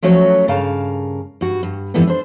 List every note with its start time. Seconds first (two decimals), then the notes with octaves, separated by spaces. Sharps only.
0.03 F3 F#3 A3 C#4 F#4 C#5
0.48 G2 C#3 A#4 F5 A5
1.41 G2 F#4
1.63 G2
1.94 F2 G#2 E3 G3 B3 A4
2.07 D4 C5